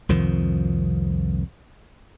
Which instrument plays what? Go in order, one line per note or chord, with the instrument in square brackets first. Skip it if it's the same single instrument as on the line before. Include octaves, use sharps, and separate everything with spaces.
[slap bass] C2 F2 D#3 F3